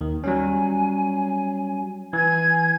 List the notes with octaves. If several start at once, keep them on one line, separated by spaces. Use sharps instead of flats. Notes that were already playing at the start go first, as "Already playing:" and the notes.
D#2 D#3
F#3 G3 C#4 G#5
E3 G#5 G#6